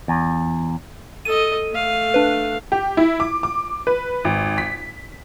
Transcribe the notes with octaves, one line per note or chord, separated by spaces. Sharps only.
E2
A4 D#5 D#7
A3 F5
D4 B4
G4
E4
D6
D6
B4
G#1
B6